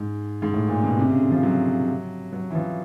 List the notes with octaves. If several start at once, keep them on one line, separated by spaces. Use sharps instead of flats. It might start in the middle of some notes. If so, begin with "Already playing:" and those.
Already playing: G#2
G#2
A2
A#2
B2
C3
C#3
D3
F3
F#3
F#3
E3
F3